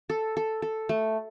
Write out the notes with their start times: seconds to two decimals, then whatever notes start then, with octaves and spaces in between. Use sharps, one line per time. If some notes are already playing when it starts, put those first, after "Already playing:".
0.10 A4
0.37 A4
0.62 A4
0.89 A3